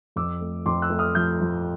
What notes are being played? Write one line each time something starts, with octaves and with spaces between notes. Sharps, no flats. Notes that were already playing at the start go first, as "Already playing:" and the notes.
F2 D6 E6
A3
F2 C6 D6
E6 F#6
A3
D#6 F6
F3 F6 G6
F3